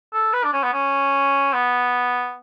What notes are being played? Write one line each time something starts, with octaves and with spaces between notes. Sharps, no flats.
A4
B4
D4
C#4
B3
C#4
B3